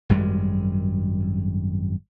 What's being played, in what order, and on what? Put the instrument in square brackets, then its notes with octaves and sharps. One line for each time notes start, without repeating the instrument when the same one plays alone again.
[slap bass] G#1 F#2 G3 G#3